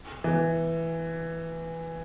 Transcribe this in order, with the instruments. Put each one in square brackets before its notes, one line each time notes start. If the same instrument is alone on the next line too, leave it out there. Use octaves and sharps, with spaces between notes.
[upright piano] E3